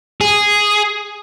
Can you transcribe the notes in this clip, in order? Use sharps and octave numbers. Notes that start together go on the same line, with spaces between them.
G#4